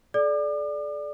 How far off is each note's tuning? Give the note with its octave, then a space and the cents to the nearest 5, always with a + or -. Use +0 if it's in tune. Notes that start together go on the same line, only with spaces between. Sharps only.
A4 -45 D5 +0 D6 +40